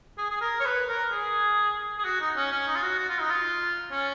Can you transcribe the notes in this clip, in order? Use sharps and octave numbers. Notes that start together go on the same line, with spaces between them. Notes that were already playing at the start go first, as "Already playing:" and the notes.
G#4
G#4
A#4
C#5
B4
A#4
G#4
G#4
F#4
D#4
C#4
C#4
D#4
F4
F#4
F#4
F4
D#4
F4
C#4